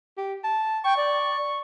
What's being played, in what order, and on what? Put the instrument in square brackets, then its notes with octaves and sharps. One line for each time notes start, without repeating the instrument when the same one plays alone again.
[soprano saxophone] G4
A5
[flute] G5 [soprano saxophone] C#6
[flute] D5